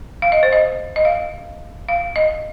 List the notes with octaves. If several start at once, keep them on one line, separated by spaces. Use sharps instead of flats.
F5
D#5
C5
D#5
D#5
F5
F5
D#5